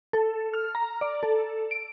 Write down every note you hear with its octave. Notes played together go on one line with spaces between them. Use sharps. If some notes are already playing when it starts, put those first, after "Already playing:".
A4
F6
A#5
D5
A4
D7